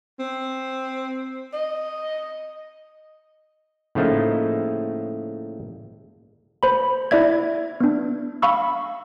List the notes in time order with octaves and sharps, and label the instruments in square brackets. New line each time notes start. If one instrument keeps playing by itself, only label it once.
[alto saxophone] C4
D#5
[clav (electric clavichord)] A2 C#3 F3 A3 A#3 D#4
[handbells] C5 B5
E4 D5 E5 G#6
B3 D4
F5 B5 C#6 E6